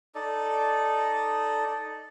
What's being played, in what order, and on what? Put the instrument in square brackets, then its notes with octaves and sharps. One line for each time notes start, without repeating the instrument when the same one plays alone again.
[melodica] D#4 A4 D5